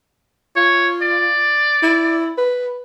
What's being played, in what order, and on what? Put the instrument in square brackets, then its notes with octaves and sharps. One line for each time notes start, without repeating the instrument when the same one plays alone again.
[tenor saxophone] F4 [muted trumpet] C#5
[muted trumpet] D5
[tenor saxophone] E4
B4